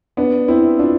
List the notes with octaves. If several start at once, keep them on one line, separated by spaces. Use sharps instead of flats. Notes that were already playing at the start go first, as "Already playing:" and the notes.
B3 D4
C4 E4
D4 F4